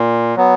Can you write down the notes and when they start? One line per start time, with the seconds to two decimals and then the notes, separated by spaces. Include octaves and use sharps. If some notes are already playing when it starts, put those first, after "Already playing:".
Already playing: A#2
0.36 F#3 B3